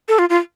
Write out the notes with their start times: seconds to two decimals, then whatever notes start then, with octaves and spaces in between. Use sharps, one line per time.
0.09 A4
0.19 F4
0.30 F4